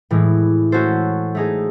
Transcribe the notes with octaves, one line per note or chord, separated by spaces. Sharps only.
A2 E3 G#3
A3 C#4 F#4 A4 C5
A3 D#4 G#4